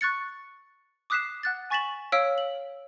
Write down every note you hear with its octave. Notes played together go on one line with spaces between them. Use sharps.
C#6 F#6 A6 C#7
D6 D#6 F#6 B6 C7 E7
F#5 F#6 A6
G#5 C#6 A6 B6 E7 F#7
C#5 F5 E6 F6 B6 D7
F#7